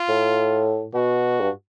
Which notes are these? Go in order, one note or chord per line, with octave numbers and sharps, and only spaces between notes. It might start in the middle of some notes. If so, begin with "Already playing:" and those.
Already playing: F4
A2
B2 F#4
G2